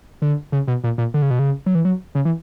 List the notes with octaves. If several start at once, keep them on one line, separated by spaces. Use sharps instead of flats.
D3
C#3
B2
A#2
A#2
D3
C#3
B2
C#3
F#3
E3
F#3
C#3
E3